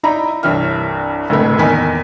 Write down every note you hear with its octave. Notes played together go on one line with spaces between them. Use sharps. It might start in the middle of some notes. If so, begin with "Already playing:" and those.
D#4 E4 D5 E5 A#5 B5
C2 G2 E3 C#5 E5 F6
F#1 D2 A2 C3 B4 E5
E2 D#3 A#3 D#5 G#5 B6